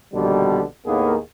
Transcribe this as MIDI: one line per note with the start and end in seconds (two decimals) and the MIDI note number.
0.13 0.62 34
0.13 0.62 47
0.13 0.62 50
0.13 0.62 51
0.13 0.62 55
0.86 1.15 39
0.86 1.15 45
0.86 1.15 51
0.86 1.15 58
0.86 1.15 59
0.86 1.15 68